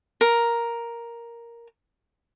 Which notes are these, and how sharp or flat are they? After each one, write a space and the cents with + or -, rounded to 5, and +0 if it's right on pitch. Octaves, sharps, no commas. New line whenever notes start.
A#4 +5